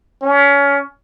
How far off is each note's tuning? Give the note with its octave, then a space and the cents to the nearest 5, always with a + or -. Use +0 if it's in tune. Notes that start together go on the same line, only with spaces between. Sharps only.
C#4 +25